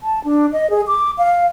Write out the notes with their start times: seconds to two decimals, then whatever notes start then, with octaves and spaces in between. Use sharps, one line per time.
0.03 A5
0.24 D4
0.52 D#5
0.70 G#4
0.87 D6
1.18 F5